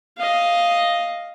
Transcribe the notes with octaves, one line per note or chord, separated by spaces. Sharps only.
D#5 F5